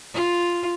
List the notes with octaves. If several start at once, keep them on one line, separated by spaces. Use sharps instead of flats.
F4